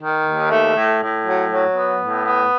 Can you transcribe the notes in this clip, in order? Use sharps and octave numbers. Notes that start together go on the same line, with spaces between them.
D#3
D#2
A3
A2
A2
F#3
F#3
B3
A2
B3